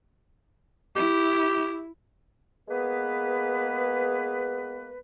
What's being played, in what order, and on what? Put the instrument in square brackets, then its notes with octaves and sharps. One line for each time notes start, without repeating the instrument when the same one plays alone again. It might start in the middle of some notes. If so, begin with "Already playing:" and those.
[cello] E4 [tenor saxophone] G4
[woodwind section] G#3 A#3 B3 G#4 B4